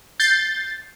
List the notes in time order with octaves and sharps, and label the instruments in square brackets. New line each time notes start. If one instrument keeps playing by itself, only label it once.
[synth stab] G6 A6 C7